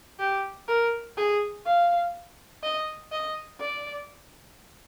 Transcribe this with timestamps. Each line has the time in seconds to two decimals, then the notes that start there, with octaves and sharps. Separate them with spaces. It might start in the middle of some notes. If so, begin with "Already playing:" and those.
0.19 G4
0.68 A#4
1.17 G#4
1.66 F5
2.63 D#5
3.12 D#5
3.60 D5